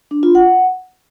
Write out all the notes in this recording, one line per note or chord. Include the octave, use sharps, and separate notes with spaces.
D4
F4
F#5